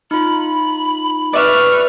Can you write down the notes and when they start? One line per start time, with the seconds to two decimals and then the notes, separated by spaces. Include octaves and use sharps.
0.11 D#4 F4 B5
1.33 B4 D5 E5 C#6 F6